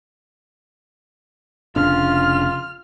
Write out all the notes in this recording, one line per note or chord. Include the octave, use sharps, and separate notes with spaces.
F1 C#3 D4 F4 F6